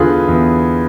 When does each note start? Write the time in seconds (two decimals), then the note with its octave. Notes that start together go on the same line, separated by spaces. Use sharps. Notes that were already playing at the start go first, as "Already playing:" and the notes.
Already playing: E2 D3 F4 G#4 B4
0.28 E2